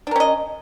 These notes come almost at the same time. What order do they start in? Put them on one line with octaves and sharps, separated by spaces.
D4 A#4 C#4 D#5